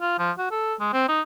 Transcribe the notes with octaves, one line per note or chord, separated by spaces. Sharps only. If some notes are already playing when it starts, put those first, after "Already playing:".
F4
F3
F#4
A4
G#3
C4
D#4